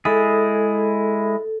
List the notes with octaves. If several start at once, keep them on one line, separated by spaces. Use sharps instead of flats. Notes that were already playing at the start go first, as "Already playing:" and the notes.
G#3 E4 G#4 A4